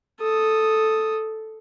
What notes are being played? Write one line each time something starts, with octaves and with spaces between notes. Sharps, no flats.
A4 D#6